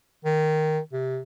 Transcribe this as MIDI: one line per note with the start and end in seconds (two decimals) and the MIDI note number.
0.25 0.79 51
0.93 1.21 48